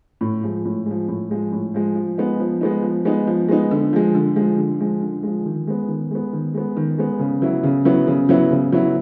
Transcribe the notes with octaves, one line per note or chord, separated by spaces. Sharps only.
A2
F3 G#3
A2
F3 G#3
A2
F3 G#3
A2
F3 G#3
F3
G#3 B3 D#4
F3
G#3 B3 D#4
F3
G#3 B3 D#4
F3
G#3 B3 D#4
D3
F3 G#3
D3
F3 G#3
D3
F3 G#3
D3
F3 G#3
D#3
G#3 B3
D#3
G#3 B3
D#3
G#3 B3
D#3
G#3 B3
C#3
F#3 B3 E4
C#3
F#3 B3 E4
C#3
F#3 B3 E4
C#3
F#3 B3 E4